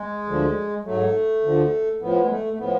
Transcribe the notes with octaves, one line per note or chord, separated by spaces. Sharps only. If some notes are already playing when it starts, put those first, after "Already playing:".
Already playing: G#3
D2 D3 F3
G#2 F#3 A3
D2 D3 F3
A2 F3 B3
G#3
A3
A3
A2 F3 B3